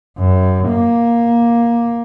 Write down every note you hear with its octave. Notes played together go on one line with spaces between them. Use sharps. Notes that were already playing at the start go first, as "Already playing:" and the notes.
F#2
A#3